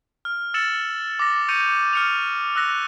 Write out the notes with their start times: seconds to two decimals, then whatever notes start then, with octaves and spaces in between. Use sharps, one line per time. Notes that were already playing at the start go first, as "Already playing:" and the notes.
0.25 F6
0.54 E6 A6 C#7 E7 F#7
1.19 D6 A#6
1.48 C#6 G6 A#6 C#7 D#7 F7
1.93 F6 C#7 F7
2.56 E6 F#6 A#6